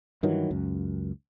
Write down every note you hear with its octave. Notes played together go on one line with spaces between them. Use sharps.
G2 D#3 E3 F#3
C#2 F#2